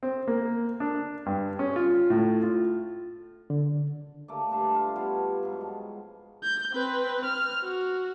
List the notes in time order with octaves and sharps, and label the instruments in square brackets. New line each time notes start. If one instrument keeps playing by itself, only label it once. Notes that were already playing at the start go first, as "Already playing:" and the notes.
[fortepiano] C4
A#3
D4
G2
C#4
F4
A2
F4
[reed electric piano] D3
[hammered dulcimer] A3 A#3 D5
G2 D4 A5 C6
F4 F5
G3 B3 F4 C#5
G#2 F#3
F3
[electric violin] G6
C4 B4
F6
F#4